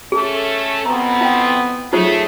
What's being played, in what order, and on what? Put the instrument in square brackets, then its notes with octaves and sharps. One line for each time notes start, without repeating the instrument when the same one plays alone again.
[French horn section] A3 C#4 A4 [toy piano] G#4
[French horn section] F2 B2 C4 [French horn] B3 [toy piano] A#5
[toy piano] E4 F5 G5
[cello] F#3 G#4 [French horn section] A3 [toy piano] D#4 F4 C5